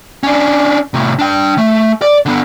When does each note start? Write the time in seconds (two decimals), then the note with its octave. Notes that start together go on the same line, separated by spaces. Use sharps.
0.23 C#4 D4
0.94 A2 C3
1.19 D4 G5
1.58 A3
2.02 D5
2.26 D3 B3